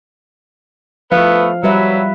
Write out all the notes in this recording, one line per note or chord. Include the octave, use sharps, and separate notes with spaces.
F3 A3 B3 F5
F#3 G3 B4 E5